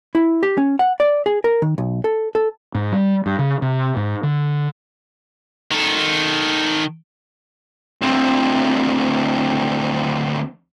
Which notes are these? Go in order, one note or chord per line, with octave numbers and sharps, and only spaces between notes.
E4
G4
C#4
F#5
D5
G#4
A#4
D#3
B1
A4
A4
G#2
G3
G2
C#3
C3
G#2
D3
D#3 A4
D2 C4